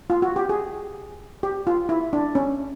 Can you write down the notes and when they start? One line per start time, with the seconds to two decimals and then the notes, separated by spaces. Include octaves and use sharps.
0.10 F4
0.22 F#4
0.36 G4
0.49 G#4
1.43 G4
1.67 F4
1.89 E4
2.13 D4
2.35 C#4